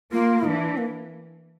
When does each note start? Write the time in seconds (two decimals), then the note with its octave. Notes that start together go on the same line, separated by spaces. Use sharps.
0.12 A#3 F4
0.48 E3 D4
0.77 A#3